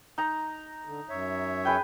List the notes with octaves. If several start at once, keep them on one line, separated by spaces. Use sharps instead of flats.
D#4 A#5
D3
F#2 C#5 E5
G#4 B4 G5